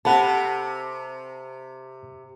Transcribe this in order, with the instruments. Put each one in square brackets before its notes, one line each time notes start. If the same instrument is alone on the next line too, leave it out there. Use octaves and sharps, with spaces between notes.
[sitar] C3 [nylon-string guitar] A4 F#5 [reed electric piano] A5 B5